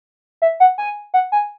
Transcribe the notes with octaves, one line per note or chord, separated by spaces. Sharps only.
E5
F#5
G#5
F#5
G#5